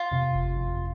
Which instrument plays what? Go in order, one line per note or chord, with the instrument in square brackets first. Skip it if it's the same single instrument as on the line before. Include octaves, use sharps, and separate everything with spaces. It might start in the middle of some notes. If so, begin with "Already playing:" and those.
Already playing: [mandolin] F4
[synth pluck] F2 C3
G1
F2 C3